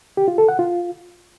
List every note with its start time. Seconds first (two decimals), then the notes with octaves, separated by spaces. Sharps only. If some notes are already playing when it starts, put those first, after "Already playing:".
0.17 G4
0.28 F4
0.38 A4
0.48 F#5
0.59 F4